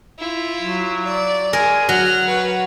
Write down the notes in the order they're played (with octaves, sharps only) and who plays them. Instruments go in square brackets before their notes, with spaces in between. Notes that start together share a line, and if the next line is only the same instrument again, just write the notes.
[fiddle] E4 F4
[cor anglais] F#3
[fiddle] D5
[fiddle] G#3 [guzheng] A#4 [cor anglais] G#5
[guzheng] F#3 [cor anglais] F#5 [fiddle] F6
[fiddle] F#4 B4